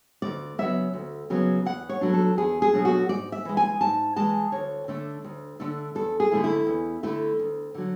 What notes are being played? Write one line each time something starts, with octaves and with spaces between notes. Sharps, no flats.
D2 D5
C#3 F#3 B3 E5
D2
C#3 F#3 B3
E2 F#5
C#5
B2 F#3 A3 D4
A4
E2 G#4
G#4
B2 F#3 A3 D4
F#4
G#2 D5
E5
E3 G#3
G#5
G#2 A5
E3 G#3 A5
D2 C#5
D3 A3 D4
D2
D3 A3 D4
E2 A4
G#4
D3 A3 E4
E4
E2
D3 A3 E4
D2
D3 F#3